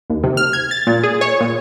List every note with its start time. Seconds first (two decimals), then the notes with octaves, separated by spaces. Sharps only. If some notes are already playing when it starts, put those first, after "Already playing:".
0.10 D#2
0.24 C3
0.37 F6
0.53 G#6
0.71 A6
0.87 A#2
1.03 G#4
1.21 C#5
1.40 A#2